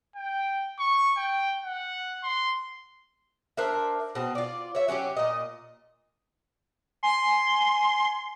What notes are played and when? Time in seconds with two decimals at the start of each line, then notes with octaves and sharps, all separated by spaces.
0.16 G5
0.79 C#6
1.17 G5
1.63 F#5
2.24 C6
3.57 D4 A#4 C5 E5
4.15 B2 C4
4.35 F4 D5
4.75 C#5 E5
4.88 F#3 C#4 D#4 G4
5.17 A#2 D#5
7.03 G#5 C6